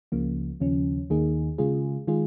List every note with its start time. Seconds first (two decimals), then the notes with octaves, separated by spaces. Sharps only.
0.12 C#2 C#3 F3 A#3
0.60 D#2 C#3 F3 C#4
1.10 D#2 D#3 A#3 D#4 G#4
1.58 C#3 G#3 F4 G#4
2.07 D#3 G#3 F4 G#4